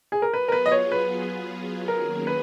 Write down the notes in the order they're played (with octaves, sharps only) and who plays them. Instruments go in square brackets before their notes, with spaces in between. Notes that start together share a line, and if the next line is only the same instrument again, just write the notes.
[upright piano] G#4
A#4
[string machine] F#3 B3 F4 G#4 [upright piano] B4
[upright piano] A#4
B4
D#5
C#5
B4
[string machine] D#3 F#3 A#3 C#4 G#4 [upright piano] A#4
[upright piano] B4